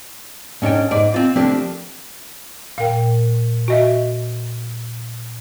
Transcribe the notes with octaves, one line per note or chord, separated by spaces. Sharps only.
G#2 C#4 D4 G5
G#2 D5
C4 F4
F3 A3 A#3 C4 D4 G4
A#2 A#4 F5 G5
F#4 D#5 E5